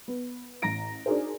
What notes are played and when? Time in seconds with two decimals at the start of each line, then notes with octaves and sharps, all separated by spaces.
0.08 B3
0.62 A1 A#5 A#6 D7
1.06 D4 D#4 F#4 G#4 A#4 C5